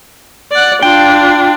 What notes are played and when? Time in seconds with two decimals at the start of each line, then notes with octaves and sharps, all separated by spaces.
0.51 D5 F#5
0.82 D4 F4 G5